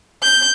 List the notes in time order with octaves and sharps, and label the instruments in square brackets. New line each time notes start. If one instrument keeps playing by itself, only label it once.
[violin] G6